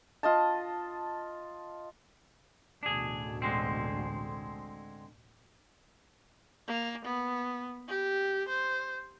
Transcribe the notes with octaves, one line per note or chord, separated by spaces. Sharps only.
F4 D#5 A5
A1 D2 B2 D4 G#4
D3 G#3 C4
A#3
B3
G4
C5